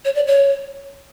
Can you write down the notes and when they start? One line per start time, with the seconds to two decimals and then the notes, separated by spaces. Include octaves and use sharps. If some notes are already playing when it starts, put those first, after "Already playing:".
0.05 C#5
0.15 D5
0.27 C#5